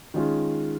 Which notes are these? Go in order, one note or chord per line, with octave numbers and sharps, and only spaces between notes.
D#3 G#3 C#4 F4